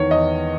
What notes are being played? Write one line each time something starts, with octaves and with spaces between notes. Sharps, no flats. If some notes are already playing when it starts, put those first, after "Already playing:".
Already playing: E2 D#3 C#5
E2 D#5